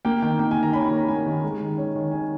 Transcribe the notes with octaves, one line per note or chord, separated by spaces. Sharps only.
A#3 G5
D#3 G5
A#3 G5
G#5
D#3
A#5
C#4 B5
B5
A#3
A#5
A#3 G#5
D#3
G#3
D#3
C#4
D#3
C#4 G#5